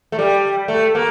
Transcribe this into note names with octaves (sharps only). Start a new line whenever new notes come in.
A3
G3
A3
A#3